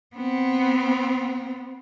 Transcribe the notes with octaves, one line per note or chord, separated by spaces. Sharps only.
B3 C4